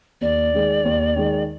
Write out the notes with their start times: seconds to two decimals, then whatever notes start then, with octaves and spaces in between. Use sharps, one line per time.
0.21 D#2 D5
0.54 D#3 G#3
0.85 D#2
1.16 D#3 G#3